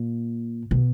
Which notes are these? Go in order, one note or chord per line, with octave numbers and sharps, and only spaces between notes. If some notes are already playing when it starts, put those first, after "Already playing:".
Already playing: A#2
B2